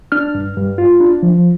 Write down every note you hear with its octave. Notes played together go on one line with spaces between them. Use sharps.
D4 F6
G2
G2
F4
D4
F3